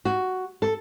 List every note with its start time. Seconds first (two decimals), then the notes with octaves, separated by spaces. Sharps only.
0.05 F#4
0.62 A4